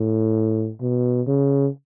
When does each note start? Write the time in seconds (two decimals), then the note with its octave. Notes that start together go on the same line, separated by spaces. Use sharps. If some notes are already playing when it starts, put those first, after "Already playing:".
Already playing: A2
0.81 B2
1.27 C#3